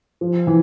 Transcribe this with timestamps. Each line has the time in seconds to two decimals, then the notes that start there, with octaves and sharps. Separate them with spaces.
0.21 F3
0.47 E3